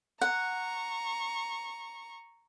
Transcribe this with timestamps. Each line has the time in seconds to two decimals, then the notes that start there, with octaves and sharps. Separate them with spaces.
0.21 F#5 A#5 C#6